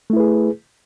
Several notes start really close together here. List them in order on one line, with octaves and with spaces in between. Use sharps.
A3 E4 B4 G#4